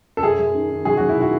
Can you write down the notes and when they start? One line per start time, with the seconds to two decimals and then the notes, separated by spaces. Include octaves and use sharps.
0.17 A4
0.23 F#2 G#4
0.39 F#2
0.54 D#3
0.70 D#3
0.85 F#3 G#4
0.97 F#3 F#4
1.09 E4
1.16 D#3 F#4